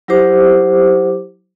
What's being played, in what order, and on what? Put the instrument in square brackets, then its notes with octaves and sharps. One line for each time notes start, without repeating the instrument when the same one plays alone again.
[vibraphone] F#3 E4 G4 C5 D6